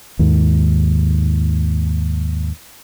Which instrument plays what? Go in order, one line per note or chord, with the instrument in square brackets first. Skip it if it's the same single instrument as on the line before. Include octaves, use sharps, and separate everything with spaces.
[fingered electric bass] D#2 G#2